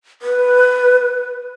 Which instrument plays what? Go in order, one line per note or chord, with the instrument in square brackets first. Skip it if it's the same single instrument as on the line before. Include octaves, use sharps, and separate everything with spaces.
[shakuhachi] B4